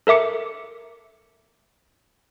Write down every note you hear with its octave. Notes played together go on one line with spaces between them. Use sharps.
A4 A#4 E5 D6 C#7